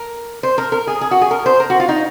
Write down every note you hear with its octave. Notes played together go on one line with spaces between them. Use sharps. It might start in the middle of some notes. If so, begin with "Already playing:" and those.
Already playing: A#4
C5
A#4
A#4
G#4
G#4
F#4
G#4
A#4
C5
A#4
F#4
F4
D#4